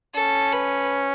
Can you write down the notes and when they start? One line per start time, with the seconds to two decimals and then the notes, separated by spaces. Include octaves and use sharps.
0.14 C#4 A4
0.52 B4